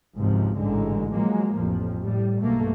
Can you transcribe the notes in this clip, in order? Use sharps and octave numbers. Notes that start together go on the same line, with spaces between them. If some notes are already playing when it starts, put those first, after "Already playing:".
G#1 C#2 G#2 C3 F3
A1 G#2 D3 G#3
F3 F#3 G#3 A#3
A1 F2 A2 F3
A2 G3
B1 G2 B2 A3 A#3